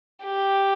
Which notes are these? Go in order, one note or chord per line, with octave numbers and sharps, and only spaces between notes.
G4